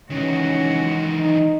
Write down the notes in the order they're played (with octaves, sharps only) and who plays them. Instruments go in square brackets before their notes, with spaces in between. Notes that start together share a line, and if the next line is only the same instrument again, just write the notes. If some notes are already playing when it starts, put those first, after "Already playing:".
[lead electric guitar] D#3 E3 [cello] G#3 F#4 [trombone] C#4
[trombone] D#4